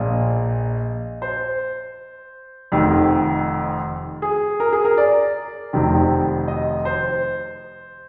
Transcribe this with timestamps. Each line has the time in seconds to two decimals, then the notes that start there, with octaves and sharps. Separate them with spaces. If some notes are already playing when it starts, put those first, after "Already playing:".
Already playing: A#1 A#2 D#5
1.22 C5
2.72 F1 F2 D#3
4.22 G#4
4.60 A#4
4.73 G#4
4.85 A#4
4.98 D5
5.73 F1 F2 C3 D#3
6.48 D#5
6.85 C5